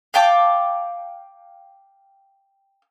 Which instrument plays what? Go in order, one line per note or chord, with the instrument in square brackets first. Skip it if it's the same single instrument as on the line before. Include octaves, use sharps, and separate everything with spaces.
[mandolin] F5 G5 A5 D6